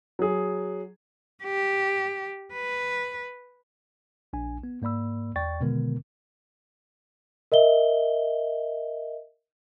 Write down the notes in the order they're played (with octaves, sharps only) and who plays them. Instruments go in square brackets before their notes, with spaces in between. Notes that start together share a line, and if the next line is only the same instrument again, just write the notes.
[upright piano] F#3 G#4
[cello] G4
B4
[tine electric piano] A#1 D4 G#5
B3
G#2 A#3 D5 B5 E6
E2 D5 G5 C#6 A6
B2 D3 D#3 G#3 B3 A#4
[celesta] A#4 D#5 E5 G7